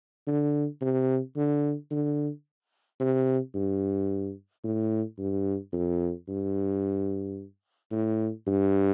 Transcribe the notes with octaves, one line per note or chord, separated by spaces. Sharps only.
D3
C3
D3
D3
C3
G2
A2
G2
F2
G2
A2
G2